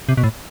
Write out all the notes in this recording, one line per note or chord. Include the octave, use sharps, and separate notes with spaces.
C3
B2
A2